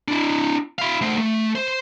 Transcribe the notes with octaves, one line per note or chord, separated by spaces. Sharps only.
D4 E4
E4 F5
A3 C5
A3
C5